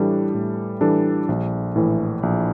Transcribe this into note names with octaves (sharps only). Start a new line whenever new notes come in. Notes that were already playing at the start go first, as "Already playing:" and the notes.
Already playing: A2 E3 G3 D4 A4
A2
E3 G3 D4 A4
A#1
A2 E3
A#1